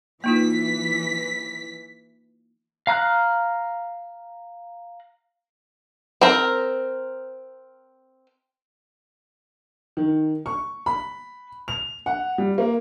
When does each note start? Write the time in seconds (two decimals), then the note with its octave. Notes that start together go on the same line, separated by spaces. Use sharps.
0.24 E3 A#3 D#4 F4 B6
2.87 F5 A#5 F6 F#6
6.21 C4 A#4
9.97 D#3
10.46 C#6
10.86 B5
11.68 F7
12.06 F#5
12.38 G3
12.58 A#3